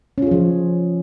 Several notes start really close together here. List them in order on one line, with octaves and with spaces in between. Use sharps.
C#4 F4 G#4 F3